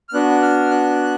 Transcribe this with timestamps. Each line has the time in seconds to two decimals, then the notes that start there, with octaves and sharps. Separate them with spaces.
0.09 F6
0.13 B3 D4 F#4 F#6
0.42 F6
0.71 F#6